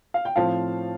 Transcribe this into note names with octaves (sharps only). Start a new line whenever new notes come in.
F5
G5
A2 F3 C4 F5 A5